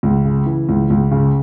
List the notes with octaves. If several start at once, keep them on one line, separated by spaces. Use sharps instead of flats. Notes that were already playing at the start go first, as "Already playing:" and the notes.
C#2
C#3
E3
C#2
C#2
C#3